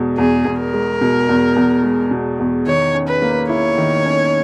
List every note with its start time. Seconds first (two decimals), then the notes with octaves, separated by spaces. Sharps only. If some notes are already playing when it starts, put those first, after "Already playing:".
Already playing: E2 B2 G#3
0.18 E2 G#4
0.45 E2
0.59 A#4
0.74 G#3
1.01 B2
1.29 E2
1.56 E2
1.84 G#3
2.11 B2
2.39 E2
2.67 D#3 C#5
2.95 C#4
3.08 B4
3.22 A#3
3.49 E4 C#5
3.78 D#3
4.05 C#4